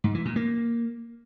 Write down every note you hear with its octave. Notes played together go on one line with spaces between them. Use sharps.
G#2
E3
A#2
A#3